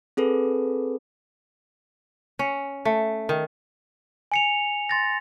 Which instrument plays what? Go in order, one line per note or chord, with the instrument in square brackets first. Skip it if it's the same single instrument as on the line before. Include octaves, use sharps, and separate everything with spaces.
[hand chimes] C4 G#4 A4 B4
[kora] C#4
A3
D#3
[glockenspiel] G#5 C#7 F7
C6 A6 A#6